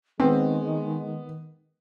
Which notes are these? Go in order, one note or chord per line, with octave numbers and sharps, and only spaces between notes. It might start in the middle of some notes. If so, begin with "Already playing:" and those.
D#3 G#3 B3 C4